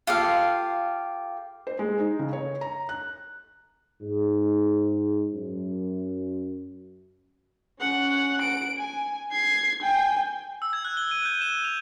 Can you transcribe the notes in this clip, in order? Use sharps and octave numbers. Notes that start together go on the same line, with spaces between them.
F4 G4 A4 F5
C5
G#3
D#4
C#3
C#5
A#5
F#6
G#2
F#2
C#4 F#5
D7
G#5
G#6 C7
G5 G#5
E6
G#6
F#6
G7
D#7
G6
E7
F7